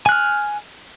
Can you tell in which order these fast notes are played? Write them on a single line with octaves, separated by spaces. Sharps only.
G#5 F#6 F6